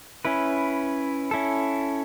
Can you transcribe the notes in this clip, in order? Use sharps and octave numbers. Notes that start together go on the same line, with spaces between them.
C#4 E4 B4
C#4 E4 A4